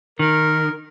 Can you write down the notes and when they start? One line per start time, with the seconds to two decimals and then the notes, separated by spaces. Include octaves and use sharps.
0.19 D#3 A#4